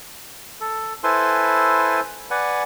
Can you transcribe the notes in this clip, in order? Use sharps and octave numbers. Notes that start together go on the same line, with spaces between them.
A4
E4 A4 B4 C5 G#5 C6
B4 D5 F#5 G#5